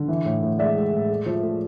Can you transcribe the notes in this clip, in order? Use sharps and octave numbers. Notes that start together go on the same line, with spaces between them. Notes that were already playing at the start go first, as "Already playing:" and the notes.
Already playing: D3
E3
A2
A2
G#3 D5 E5
G#3
A2
A3
F3
A3